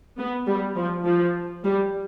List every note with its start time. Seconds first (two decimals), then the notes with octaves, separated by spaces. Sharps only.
0.18 B3
0.47 G3
0.76 F3
1.05 F3
1.63 G3